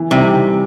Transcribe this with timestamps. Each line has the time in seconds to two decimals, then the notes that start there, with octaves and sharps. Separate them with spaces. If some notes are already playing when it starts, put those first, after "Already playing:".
Already playing: E3
0.11 C3 G3 C4 D#4